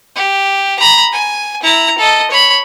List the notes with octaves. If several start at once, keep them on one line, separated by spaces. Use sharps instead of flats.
G4
A#5 B5
G#5
E4 A#5
A4 D#5
C#5 B5